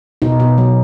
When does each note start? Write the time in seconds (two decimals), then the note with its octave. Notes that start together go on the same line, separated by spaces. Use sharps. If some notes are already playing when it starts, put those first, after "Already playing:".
0.22 B2 D#4
0.40 B2
0.58 F#3